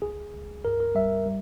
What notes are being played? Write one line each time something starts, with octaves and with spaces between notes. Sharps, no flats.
C#2 G#4
C#2
G2 A#4
A#4
G3 E5
G3